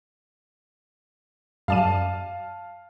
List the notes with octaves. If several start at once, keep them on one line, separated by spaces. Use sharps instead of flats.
F#2 D5 F5 A5 D#7